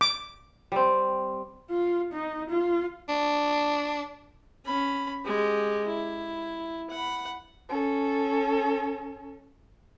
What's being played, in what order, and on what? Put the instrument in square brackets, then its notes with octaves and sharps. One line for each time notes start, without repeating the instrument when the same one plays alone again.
[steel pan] D6
[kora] G3 C4
[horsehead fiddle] F4
D#4
F4
[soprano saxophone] D4
[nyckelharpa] C#4 B5
G#3 G4
E4
F#5 B5
[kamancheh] C#4 A4